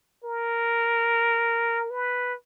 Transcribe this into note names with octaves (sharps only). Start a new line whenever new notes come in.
A#4
B4